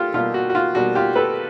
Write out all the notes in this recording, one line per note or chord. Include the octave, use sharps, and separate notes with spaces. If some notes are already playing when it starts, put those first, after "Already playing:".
Already playing: G3 A#3 F4 G4 A4
B2 G3 A#3 F4
F#4
F#4
F4
B2 G3 A#3 F#4
F4 G4
A4 B4